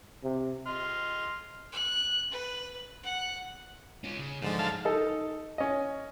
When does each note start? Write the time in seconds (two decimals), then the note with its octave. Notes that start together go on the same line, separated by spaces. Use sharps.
0.24 C3
0.66 D#5 C6 F6
1.72 F#6
2.32 B4
3.03 F#5
4.04 C#4 F4
4.19 C#3
4.42 G#2 D3 F3 G#3
4.59 F#3 F5 A5
4.85 D#4 A4
5.58 C#4 D#5